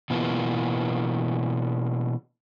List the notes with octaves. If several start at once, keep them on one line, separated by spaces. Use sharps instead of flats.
B2 E3 A#3 B3 F4